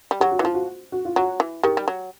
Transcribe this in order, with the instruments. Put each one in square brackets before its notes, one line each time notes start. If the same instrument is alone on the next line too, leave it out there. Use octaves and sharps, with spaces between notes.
[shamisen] G3
[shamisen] F#3 [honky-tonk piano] G4
[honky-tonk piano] F#4
[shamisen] E3
[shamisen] F3 [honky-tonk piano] F4
[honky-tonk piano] F#4
F#4
F4
[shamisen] F#3 [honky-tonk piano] F#4
[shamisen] E3
[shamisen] D#3 [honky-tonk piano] G4
[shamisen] G3
F#3